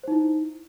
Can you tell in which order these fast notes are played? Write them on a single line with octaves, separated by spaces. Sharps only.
C5 D#4 E4